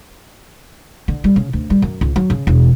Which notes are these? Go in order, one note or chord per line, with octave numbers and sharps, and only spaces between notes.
D3
G3
C#3
D2
G3
F#2
C#2
F#3
C#3
E1